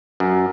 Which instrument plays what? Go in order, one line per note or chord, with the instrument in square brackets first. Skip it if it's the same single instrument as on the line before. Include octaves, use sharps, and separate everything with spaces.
[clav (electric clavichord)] F#2